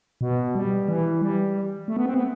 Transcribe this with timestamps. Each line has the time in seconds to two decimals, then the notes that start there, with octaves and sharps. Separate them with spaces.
0.21 B2
0.55 G3
0.88 E3
1.22 G3
1.88 A3
1.97 B3
2.06 C4
2.14 B3